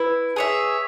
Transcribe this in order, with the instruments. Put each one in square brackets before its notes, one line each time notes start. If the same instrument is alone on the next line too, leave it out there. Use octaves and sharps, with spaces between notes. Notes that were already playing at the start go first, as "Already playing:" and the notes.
Already playing: [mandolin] E4 [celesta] B4
[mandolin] G#4 C#5 E5